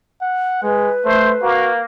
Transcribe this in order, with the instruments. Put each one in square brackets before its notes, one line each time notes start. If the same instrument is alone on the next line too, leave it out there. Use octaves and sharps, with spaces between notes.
[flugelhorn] F#5
[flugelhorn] G#3 [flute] B4
[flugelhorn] A3 [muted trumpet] C5
[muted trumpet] A#3 [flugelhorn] F#4